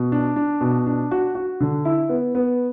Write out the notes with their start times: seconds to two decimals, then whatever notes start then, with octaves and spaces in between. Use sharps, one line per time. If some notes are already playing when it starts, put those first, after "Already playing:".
Already playing: B2
0.12 D4
0.36 D4
0.61 B2
0.87 D4
1.11 F#4
1.35 F#4
1.60 D3
1.85 E4
2.09 B3
2.35 B3